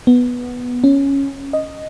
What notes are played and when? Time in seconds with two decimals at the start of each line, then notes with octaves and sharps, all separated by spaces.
0.07 B3
0.84 C#4
1.53 D#5